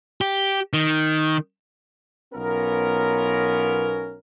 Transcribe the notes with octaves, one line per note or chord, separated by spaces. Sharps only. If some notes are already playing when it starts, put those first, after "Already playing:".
G4
D#3
B1 B3 C#4 F4 A#4